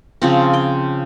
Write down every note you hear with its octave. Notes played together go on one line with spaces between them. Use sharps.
C#3 F3 C4
G5